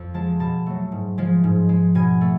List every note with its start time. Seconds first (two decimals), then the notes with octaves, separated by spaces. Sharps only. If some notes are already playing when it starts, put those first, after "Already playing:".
Already playing: F2
0.14 F3 G#3 A5
0.40 B2 A5
0.66 F#3 A3
0.92 G#2
1.18 F3 G#3
1.44 G#2
1.69 G#3
1.95 B2 G#5
2.21 A3